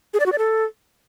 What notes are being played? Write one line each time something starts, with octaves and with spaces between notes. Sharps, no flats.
G#4
D5
F#4
D5
A4